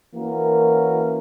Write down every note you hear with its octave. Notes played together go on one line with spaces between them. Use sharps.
E3 A#3 C#4 F#4 A#4